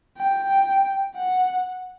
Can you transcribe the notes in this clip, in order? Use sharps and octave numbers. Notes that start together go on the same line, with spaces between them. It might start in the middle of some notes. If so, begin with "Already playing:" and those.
G5
F#5